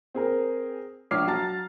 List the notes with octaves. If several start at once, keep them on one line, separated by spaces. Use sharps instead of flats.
C4 G#4 A#4
A#1 C#5 D6 F6 C7
F#3 A5 A#5 F6 A6